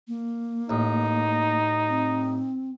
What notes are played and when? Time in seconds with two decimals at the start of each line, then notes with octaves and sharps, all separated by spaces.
0.08 A#3
0.69 A1 D#4
1.89 C4